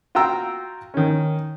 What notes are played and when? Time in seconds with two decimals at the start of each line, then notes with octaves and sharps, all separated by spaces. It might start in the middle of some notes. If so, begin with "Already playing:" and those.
0.15 F4 F#4 G5 A#5 E6
0.94 D#3 C#4